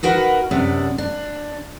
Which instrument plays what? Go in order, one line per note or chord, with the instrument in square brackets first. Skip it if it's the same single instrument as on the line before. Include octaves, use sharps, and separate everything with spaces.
[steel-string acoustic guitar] D#4 F#4 A#4 B4 F#5
F#2 C3 B3 D4
D4